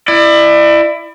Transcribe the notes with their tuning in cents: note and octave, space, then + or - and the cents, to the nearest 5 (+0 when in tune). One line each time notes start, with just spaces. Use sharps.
E4 +15 D5 +35